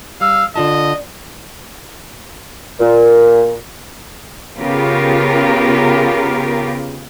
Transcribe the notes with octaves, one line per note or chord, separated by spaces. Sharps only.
G3 F5 E6
D3 F4 D5 D#5 A5
A#2
C#3 B3 F4 G4 A#4